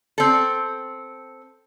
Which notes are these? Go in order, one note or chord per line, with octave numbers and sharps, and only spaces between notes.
C4 A4